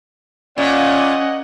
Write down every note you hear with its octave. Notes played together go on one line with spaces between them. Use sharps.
A#2 C#4 D5 D#5 F#5